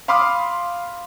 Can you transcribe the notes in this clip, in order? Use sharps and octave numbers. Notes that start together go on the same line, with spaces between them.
F5 B5 C6 D6 D#6 F6